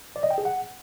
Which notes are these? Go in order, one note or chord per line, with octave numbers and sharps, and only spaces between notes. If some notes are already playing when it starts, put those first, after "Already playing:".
D5
D#5
G5
G#4
F#5